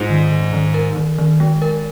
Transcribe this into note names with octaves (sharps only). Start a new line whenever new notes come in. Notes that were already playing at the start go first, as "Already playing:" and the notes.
Already playing: G#2 F4
D#3
D#3
D#3
A#4
D#3
D#3
G#3
A#4